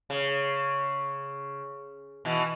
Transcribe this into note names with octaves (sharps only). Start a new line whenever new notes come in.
C#3
B2 E3